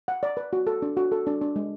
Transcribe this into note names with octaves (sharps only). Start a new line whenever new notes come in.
F#5
D5
B4
F#4
A4
D4
F#4
A4
D4
D4
G#3